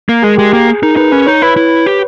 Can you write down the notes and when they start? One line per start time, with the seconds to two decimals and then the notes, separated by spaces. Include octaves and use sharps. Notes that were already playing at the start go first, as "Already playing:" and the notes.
0.09 A#3 A#4
0.23 G#3 G#4
0.37 G#3 G4
0.53 A#3 G4
0.68 G#4
0.83 D#4 A#4
0.97 D#4 B4
1.12 C#4 B4
1.27 D#4 C#5
1.42 E4 B4
1.56 E4
1.86 G4